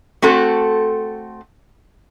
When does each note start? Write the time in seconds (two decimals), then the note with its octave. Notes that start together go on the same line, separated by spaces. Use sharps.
0.22 A3 C4 F#4 A4